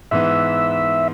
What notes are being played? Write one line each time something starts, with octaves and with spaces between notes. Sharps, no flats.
G#2 E3 B3 E5